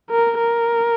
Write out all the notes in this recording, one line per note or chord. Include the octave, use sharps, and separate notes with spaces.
A#4
A#4